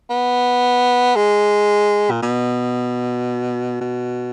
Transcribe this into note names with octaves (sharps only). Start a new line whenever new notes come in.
B3
G#3
A#2
B2
B2